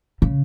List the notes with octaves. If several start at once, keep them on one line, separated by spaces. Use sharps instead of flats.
C#3